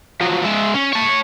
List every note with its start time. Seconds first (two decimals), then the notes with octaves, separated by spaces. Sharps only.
0.21 F3 F#3
0.45 G#3 E5
0.75 C#4
0.93 C#5 A5